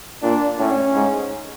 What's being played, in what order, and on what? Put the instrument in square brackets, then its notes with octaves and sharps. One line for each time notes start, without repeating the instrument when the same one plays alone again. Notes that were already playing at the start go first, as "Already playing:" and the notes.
[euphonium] A#2 [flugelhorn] D4
[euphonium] A2 [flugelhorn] C#4
[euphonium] G#2